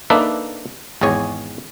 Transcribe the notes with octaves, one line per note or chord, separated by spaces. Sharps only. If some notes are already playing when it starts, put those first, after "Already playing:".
A#3 D4 D#4 A4 B4 E5
G#1 E2 G#4 C#5 G#5